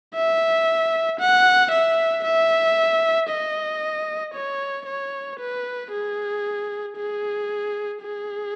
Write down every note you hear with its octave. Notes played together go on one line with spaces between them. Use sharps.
E5
F#5
E5
E5
D#5
C#5
C#5
B4
G#4
G#4
G#4